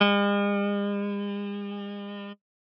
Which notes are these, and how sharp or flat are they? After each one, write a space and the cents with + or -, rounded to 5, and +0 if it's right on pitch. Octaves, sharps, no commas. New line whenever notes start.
G#3 -45